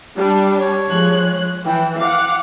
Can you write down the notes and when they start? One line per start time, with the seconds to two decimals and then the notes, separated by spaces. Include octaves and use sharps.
0.17 G3 D4
0.58 C#5
0.88 F3 G#3 F#6
1.66 E3 G5
2.01 F5 F#5 D6